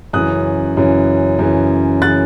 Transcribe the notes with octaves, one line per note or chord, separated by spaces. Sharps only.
F#2 C#3 E3 D#6 F#6
F#2 C#3 E3
F#2 C#3 E3
C#3 E3 F#6 A6